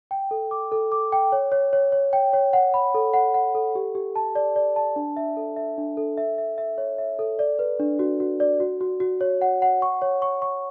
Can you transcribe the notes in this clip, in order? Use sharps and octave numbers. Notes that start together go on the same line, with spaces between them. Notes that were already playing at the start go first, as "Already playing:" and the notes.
G5
A4
D6
A4
D6
G5
C#5
C#5
C#5
C#5
G5
C#5
F#5
B5
A4
F#5
F#5
A4
G4
G4
A5
D5
D5
A5
D4
E5
A4
E5
D4
A4
E5
E5
E5
C#5
E5
A4
D5
B4
D4
F#4
F#4
D5
F#4
F#4
F#4
C#5
F#5
F#5
C#6
C#5
C#6
C#6